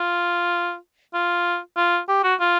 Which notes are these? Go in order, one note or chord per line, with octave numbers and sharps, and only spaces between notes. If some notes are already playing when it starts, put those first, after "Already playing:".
Already playing: F4
F4
F4
G4
F#4
F4